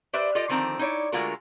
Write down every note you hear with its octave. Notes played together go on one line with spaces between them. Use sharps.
G4 B4 C5 D5 E5
F4 G4 A4 D5 D#5
D3 D#3 F3 C4 A#5
D#4 E4 C#5 D5
D3 G#3 A3 F4 F#4 A#4